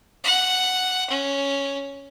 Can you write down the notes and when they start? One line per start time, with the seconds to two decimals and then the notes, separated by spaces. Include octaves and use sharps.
0.24 F#5
1.10 C#4